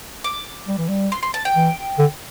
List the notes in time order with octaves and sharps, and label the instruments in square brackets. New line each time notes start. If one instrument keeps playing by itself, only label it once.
[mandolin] D6
[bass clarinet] G3
E3
G3
[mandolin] C6
C6
A5
G5
[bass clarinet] E3
D3